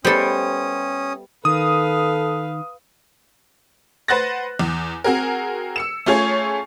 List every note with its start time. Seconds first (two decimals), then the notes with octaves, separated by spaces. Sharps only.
0.05 G3 B3 C#4 A4 C5 E5 G5 D#6
1.45 D#3 A4 B4 F5 D#6
4.08 B4 C5 F#5 F#6 A6 A#6
4.59 E2
5.04 C4 F#4 G#4 A#4
5.76 E6 C#7 E7
6.06 A3 C#4 F4 G#4 C#5 G#5